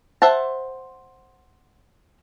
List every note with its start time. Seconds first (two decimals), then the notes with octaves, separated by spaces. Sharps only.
0.22 C5 E5 F#5 A5